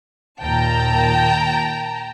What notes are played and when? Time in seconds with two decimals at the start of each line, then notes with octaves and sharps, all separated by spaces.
0.40 D#2 A#2 G5 A5 A#5